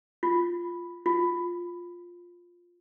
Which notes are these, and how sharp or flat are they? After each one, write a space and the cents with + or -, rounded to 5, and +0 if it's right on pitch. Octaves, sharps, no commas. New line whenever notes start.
F4 -5
F4 +5